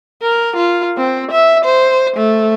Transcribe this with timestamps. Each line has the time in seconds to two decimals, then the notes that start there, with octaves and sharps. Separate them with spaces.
0.22 A#4
0.56 F4
0.97 C4
1.31 E5
1.65 C5
2.16 A3